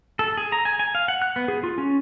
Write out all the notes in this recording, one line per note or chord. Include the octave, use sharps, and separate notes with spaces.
A4
G#4
A#5
G#5
G#5
F5
F#5
F#6
B3
G#4
F4
C#4